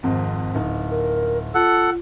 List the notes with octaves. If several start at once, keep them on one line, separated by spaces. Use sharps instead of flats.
G#1 F2 G#2
D1 D#4
A#4
F4 A4 F#5